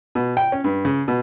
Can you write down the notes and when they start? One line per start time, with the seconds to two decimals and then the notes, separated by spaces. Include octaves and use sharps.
0.15 B2
0.37 G5
0.52 C#4
0.64 G2
0.85 C#3
1.08 B2